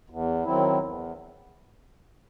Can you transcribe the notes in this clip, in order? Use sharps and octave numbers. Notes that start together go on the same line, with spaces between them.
E2
D#3 F#3 C4 E4
E2